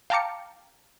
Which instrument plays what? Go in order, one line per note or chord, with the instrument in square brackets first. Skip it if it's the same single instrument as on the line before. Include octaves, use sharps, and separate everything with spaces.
[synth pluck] F5 G5 A5 A#5 D6 C#7